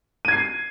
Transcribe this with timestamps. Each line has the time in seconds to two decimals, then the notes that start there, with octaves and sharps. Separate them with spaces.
0.25 D#7
0.28 G#6
0.32 C7